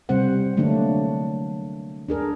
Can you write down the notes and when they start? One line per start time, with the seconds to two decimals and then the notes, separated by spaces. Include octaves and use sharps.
0.09 C3 G3 C4 C5 F#5
0.57 D3 F#3 A3 A#3 D4
2.09 D4 G#4 A#4